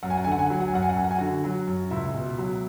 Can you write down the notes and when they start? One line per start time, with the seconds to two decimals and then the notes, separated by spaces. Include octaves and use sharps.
0.03 F#2 F#5
0.10 G#5
0.17 F#5
0.24 D3 G#5
0.32 F#5
0.39 G#5
0.46 F#5
0.50 F#3 G#5
0.60 F#5
0.68 G#5
0.73 F#2 F#5
0.83 G#5
0.89 F#5
0.96 F#2 G#5
1.04 F#5
1.11 G#5
1.18 D3 F#4 F#5
1.44 F#3
1.67 F#2
1.91 C#2 E4 E5
2.14 B2
2.38 F#3